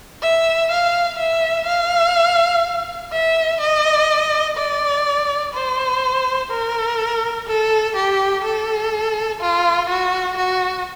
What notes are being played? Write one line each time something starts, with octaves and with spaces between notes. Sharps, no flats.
E5
F5
E5
F5
E5
D#5
D5
C5
A#4
A4
G4
A4
F4
F#4
F#4